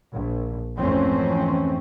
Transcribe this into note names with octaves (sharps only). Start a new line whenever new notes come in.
A#1
F2 G#2 E3 A3 C4 C#4